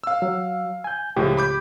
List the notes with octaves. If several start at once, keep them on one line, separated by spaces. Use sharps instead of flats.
F5 E6
F#3
G#5 G6
C#2 A2 F3 G#3 G4
B5 D6 G6